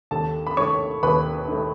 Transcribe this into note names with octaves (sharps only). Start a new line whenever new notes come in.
D#2 A4 A5
B5
D#3 A3 C#5 C#6
D#2 B4 B5
D#3 A3